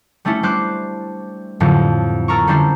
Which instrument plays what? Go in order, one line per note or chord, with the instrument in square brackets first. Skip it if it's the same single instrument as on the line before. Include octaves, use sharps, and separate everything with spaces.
[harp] G3 A3 C#4 D4 E4
G3 C5 D6 F#6 C7
F2 A2 D3 F#3 G3
A4 A#4 A#5 C#6
D3 G3 C#4 D4 E4 C5